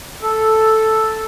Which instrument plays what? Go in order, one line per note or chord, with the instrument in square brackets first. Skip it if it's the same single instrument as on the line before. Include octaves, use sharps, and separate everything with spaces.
[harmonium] A4